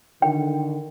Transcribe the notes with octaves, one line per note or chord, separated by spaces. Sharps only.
D3 D#3 G5